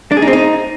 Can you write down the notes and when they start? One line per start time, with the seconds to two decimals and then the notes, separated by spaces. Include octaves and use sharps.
0.12 D4
0.17 G#4
0.22 D#4
0.28 C4
0.33 D#4